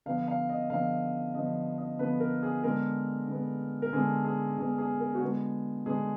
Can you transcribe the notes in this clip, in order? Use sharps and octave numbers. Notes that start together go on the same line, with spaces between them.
D3 F3 B3 F5
F5
D#5
D3 F3 B3 F5
D3 F3 B3 D#5
D#5
D3 F3 B3 B4
A#4
G#4
D3 G#3 B3 A#4
D3 G#3 B3
A#4
D3 G#3 B3 G#4
G#4
D3 G#3 B3 G#4
G#4
A#4
F#4
D3 G#3 B3 G#4
D3 G#3 B3 G#4